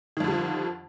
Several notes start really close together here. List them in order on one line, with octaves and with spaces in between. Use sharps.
D#3 F2 D3 G3 F3